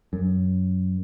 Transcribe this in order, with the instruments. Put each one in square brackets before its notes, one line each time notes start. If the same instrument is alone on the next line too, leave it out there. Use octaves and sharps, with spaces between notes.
[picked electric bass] F#2